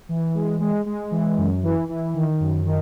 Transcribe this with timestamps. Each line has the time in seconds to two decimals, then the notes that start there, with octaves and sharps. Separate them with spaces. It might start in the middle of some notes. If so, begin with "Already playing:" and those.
0.09 E3
0.35 G#3
0.60 G#3
0.86 G#3
1.11 E3
1.37 F#2
1.63 E3
1.88 E3
2.14 D#3
2.40 F#2
2.66 D#3